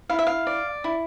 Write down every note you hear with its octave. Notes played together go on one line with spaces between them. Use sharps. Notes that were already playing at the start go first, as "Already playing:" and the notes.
E4 F5
E5
F5
D5
E4